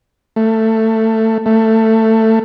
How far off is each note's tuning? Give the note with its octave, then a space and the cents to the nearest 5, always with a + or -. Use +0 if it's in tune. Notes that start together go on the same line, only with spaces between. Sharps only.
A3 +15
A3 +15